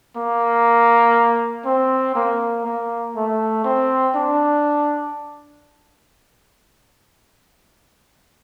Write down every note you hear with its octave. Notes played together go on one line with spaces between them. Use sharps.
A#3
C4
A#3
A#3
A3
C4
D4